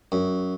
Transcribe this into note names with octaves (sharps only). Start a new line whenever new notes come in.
F#2